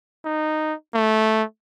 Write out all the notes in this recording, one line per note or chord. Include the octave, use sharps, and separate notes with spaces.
D#4
A3